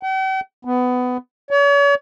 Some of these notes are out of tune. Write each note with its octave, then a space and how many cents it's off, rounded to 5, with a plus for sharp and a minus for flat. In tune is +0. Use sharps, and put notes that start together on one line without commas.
G5 -45
B3 +20
C#5 +40